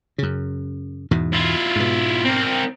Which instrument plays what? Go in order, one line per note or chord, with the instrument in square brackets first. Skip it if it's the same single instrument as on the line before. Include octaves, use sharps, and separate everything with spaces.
[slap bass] F#2 C#3
E2 G#2 B2
[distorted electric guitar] E4 F4
[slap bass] G#2 B2
[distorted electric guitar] C4 A#4